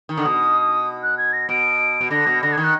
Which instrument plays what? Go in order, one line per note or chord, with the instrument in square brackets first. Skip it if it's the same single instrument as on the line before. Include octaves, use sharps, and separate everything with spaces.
[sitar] D#3
D3
[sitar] B2 [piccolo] D#6
[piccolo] F#6
G#6
A#6
[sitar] B2 [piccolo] D7
[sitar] B2
[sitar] D3 [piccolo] A#6
[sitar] B2
[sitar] D3 [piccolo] A#6
[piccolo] G#6
[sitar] D#3
[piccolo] F#6